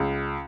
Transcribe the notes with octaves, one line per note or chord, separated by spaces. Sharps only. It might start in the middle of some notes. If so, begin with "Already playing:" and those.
Already playing: C#2